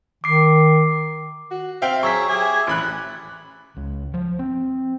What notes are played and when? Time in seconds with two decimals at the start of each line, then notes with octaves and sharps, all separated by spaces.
0.24 D#3 D6 C7
1.51 F#4
1.82 C4 E5 F5 G5
2.03 F#3 G#4 C#6 E6 B6
2.29 G4 G#4 E5 G#5
2.67 A1 B5 F#6
3.76 C#2
4.14 F3
4.39 C4